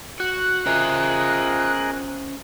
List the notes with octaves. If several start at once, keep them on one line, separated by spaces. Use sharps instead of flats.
F#4 F#6
C#4 F4 G#4 A#4 C5 D#5 E5